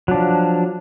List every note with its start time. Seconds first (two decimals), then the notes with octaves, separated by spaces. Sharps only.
0.08 F#3
0.11 D4
0.14 F3